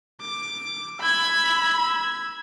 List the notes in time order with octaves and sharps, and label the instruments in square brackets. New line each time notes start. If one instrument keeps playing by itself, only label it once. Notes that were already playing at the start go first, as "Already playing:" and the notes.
[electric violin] D6
[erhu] B5 [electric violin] E6 G#6